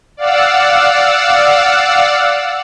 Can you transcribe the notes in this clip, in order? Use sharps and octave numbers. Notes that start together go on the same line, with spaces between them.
D5 F5 F#5 E6